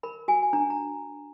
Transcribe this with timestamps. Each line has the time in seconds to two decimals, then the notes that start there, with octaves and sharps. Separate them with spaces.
0.03 A#4 B5
0.28 F#4 G#5
0.43 G#5
0.53 D4 A#5
0.70 A#5